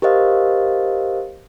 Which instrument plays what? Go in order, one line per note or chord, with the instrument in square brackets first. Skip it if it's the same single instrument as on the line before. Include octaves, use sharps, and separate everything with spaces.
[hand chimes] G4 A#4 C5 D#5 F5